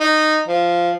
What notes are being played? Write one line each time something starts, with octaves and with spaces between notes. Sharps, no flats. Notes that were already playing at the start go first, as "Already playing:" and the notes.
D#4
F3